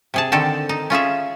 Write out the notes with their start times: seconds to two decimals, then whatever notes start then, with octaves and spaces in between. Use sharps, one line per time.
0.14 C3 G#4 A5
0.32 D3 D#3 C4 A4
0.69 D#4
0.90 C#4 F4 G#4 E5